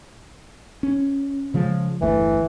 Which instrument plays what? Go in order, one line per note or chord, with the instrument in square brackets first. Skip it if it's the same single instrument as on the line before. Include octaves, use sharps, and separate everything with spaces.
[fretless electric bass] C#4
C#3 F3 G#3
[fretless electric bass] G1 E2 A3 [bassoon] E3